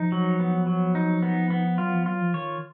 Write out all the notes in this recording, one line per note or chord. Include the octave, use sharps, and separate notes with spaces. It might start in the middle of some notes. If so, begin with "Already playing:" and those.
Already playing: F3 D#4
F#3
B3
F#3
D#4
B3
B3
F#3 F4
F3
F#3 F4
F3
D#3 C#5